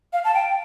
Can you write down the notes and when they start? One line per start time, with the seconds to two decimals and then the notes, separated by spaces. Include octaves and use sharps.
0.13 F5
0.25 A5
0.34 G5